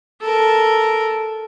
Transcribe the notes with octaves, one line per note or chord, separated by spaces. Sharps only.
A4 A#4